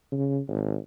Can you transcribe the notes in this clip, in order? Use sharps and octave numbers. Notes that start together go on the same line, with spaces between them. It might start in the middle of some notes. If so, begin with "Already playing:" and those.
C#3
G#1